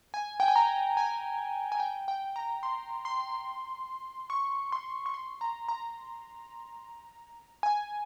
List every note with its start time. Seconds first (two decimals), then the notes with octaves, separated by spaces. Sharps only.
0.14 G#5
0.40 G5
0.48 G#5
0.56 A#5
0.97 G#5
1.72 G#5
1.80 G5
2.08 G5
2.36 A#5
2.63 C6
3.05 C6
4.30 C#6
4.72 C6
5.06 C#6
5.14 C6
5.41 A#5
5.68 A#5
7.63 G#5